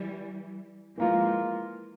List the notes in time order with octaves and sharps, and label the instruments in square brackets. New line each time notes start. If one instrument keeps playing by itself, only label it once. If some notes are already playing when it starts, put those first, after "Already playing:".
Already playing: [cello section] E3 G3
[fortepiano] E3 A#3 F4 [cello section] F3 G#3